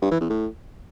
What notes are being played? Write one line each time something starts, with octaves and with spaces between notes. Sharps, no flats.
G2
E3
E2
A2